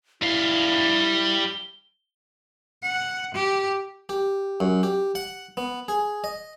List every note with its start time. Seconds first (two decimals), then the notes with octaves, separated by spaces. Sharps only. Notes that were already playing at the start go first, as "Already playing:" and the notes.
0.22 G3 E4 F5 G7
2.83 F#5
3.35 G4
4.09 G4
4.60 F#2
4.83 G4
5.15 F#5
5.57 B3
5.88 G#4
6.24 D#5